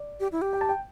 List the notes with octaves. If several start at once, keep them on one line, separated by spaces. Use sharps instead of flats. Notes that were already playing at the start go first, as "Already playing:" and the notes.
Already playing: D5
G4
E4
G4
G5
A5
G5